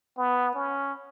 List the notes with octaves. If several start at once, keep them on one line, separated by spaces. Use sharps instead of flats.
B3
C#4